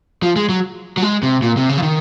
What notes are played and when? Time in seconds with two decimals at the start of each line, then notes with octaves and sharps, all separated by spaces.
0.23 F3
0.36 G#3
0.49 F#3
0.97 F#3
1.02 G#3
1.23 C3
1.42 A#2
1.57 C3
1.69 C#3
1.78 F3
1.82 D#3